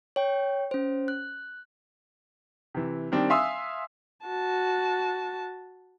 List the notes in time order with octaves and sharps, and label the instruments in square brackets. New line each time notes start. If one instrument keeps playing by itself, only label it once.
[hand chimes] C#5 G5
C#4 C5
F#6
[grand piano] C3 E3
D#3 G3 C4 D4
E5 F5 G#5 C6 D#6 E6
[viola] F#4 A5